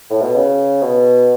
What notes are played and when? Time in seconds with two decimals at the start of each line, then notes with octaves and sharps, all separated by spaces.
0.10 A2
0.22 B2
0.34 C#3
0.82 B2